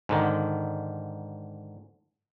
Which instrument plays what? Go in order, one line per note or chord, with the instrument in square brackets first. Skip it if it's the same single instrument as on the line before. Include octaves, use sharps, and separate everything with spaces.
[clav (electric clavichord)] G#2 D3 D#3